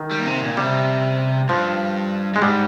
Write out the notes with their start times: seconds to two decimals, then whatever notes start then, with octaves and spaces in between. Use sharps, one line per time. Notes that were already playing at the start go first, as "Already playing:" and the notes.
Already playing: D#3
0.11 G3
0.20 A#2
0.26 C3
0.42 A#2
0.57 C3 G3
1.49 G2 F3
2.34 G2 G#3
2.42 G#2 G3